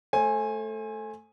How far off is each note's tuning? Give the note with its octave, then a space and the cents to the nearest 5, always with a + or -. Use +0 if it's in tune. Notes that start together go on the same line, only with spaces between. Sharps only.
A3 +0 C5 +40 G#5 +0